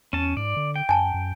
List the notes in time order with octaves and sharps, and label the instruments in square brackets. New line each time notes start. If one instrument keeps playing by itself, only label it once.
[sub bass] E2 [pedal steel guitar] C#4 A5
[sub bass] G#2 [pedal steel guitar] D5
[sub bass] D3
[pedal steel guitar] G5
[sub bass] F#2 [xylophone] G#5 A5
[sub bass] F#2